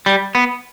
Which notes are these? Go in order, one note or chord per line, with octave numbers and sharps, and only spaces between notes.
G3
B3